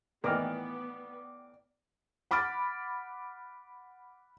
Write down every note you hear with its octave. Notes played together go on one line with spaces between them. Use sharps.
A2 D#3 E3 B3 A#4 D5
F#5 B5 D6 F6 A6